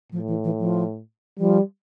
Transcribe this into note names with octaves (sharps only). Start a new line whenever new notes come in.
A2 F3
E3
E3
F3
F3 G3